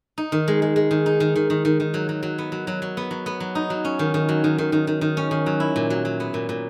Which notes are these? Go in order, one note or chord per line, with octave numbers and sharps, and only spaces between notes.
D#4
D#3
G#3
G#3
G#3
D#3
D#4
D#3
D#3
D#3
D#3
D#3
F#3
F#3
F#3
B3
F#3
F#3
F#3
B3
F#3
B3
F#3
D#4
F#3
C#4
D#3
D#3
F#3
D#3
D#3
D#3
D#3
D#3
C#4
D#3
F#3
E4
A#2
F#3
F#3
B3
A#2
A#2